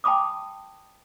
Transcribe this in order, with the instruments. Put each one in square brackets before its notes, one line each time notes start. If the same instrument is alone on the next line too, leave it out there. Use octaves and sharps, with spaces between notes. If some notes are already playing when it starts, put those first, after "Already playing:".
[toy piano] G5 A5 B5 D6 D#6